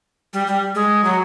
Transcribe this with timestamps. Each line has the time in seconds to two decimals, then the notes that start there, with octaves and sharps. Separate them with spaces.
0.33 G3
0.47 G3
0.75 G#3
1.04 F#3